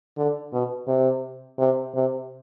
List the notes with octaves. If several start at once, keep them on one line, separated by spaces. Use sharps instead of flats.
D3
B2
C3
C3
C3